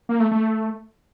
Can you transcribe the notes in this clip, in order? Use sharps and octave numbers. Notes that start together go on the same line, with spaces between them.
A#3
A3
A3